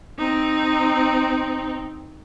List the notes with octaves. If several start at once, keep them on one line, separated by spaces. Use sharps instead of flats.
C4 D#4